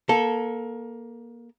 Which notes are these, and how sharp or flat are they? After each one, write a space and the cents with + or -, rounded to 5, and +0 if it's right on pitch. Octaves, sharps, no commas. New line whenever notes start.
A#3 +20 A4 +0